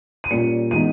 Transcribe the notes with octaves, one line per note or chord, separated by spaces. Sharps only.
D#7
A#2 G3 C#4 C#7
E3 G#3 B3 D#4 D#7